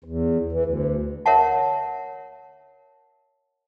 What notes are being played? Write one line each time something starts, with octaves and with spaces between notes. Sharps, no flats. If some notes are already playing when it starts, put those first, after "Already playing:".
E2
E3
D2
A#4 C#5 E5 F#5 A5